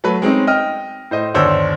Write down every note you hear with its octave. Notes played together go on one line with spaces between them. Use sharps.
F#3 A3 B4
G#3 C4 C#4 D#4
D#5 G5 F6
A2 C5 D#5
G1 D#2 D4 C5 C#5 E6